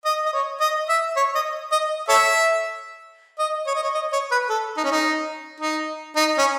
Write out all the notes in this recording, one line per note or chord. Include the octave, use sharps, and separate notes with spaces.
D#5
D#5
C#5
D#5
E5
C#5
D#5
D#5
A4 C#5 E5
D#5
C#5
D#5
C#5
D#5
C#5
B4
A4
D#4
C#4
D#4
D#4
D#4
C#4